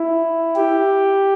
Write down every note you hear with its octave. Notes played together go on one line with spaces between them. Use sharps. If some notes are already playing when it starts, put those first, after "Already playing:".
Already playing: E4
G4